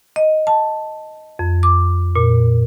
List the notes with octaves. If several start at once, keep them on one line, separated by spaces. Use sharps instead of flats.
D#5
A5
F2
D6
A#2